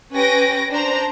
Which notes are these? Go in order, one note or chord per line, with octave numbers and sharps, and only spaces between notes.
C#4 G4 B4 A#6 D7
D4 C5 A#5